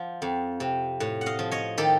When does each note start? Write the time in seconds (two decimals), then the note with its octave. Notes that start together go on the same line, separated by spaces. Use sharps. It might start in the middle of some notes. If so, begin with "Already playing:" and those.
Already playing: F3 F#5
0.22 F2
0.60 C3
1.00 A2
1.21 F#5
1.26 D#5 F5
1.39 F3
1.51 C#5 D#5
1.78 D#3 G4 A4